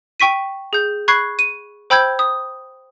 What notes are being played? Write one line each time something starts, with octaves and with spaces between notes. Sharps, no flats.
G5 C#6 B6 D#7
G#4 G6
B5 C#6 F#6 G#6 C7
D#7
C5 G5 B5 E6 G6 G#6
D#6